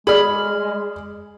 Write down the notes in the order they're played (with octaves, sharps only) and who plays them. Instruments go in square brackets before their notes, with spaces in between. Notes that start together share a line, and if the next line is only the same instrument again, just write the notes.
[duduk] G#3 [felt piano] G#4 D5 [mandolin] B5 F6